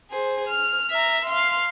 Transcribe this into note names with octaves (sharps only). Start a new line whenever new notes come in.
G#4 C5
F6
E5 A#5
F5 C6